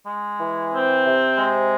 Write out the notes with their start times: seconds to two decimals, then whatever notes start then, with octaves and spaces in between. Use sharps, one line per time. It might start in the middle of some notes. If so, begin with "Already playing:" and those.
0.07 G#3
0.40 E3
0.73 C4
1.05 C3
1.38 G#3